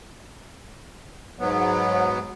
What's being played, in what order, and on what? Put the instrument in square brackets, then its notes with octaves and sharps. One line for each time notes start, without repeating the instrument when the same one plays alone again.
[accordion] G#2 F#3 B3